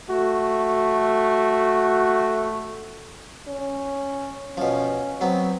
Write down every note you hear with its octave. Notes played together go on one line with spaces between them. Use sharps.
A3 F#4
C#4
B2 F3 C#4
F#3 B3 C4